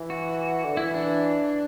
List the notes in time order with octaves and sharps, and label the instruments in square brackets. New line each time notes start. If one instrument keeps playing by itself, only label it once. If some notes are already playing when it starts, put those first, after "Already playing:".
Already playing: [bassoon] E3
[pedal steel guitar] F#4
[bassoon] D3
[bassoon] E3 [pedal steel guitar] E4
[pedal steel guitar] D4